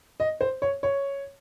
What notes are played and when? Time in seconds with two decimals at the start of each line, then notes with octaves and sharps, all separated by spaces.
0.20 D#5
0.41 C5
0.62 C#5
0.83 C#5